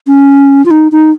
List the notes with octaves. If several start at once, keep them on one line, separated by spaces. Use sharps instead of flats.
C#4
F4
D#4
D#4